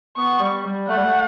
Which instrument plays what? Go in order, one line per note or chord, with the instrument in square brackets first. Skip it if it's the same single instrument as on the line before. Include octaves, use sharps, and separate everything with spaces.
[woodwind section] B3 [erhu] C#6
[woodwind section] G3
G3
[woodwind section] A3 [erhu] F#5
[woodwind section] G3
A3